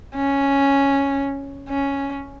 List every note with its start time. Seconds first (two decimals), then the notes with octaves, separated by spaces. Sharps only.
0.16 C#4
1.69 C#4